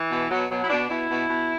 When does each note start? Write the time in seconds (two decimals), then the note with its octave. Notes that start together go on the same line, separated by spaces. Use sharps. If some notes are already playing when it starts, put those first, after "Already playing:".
Already playing: E3
0.11 B2
0.30 B2 F#3
0.50 B2 F#3
0.64 E4
0.69 B2 D4
0.89 B2 E4
1.09 B2
1.29 B2